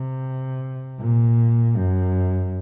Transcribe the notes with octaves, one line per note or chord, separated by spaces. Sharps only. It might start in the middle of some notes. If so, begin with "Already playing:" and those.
Already playing: C3
A#2
F#2